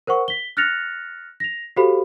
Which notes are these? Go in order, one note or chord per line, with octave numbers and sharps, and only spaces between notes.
A#4 C5 F#5 C#6
B6 G7
F6 F#6 A6 A#6 C#7 F7
A#6 F7
F#4 G4 A4 C5 F5 B5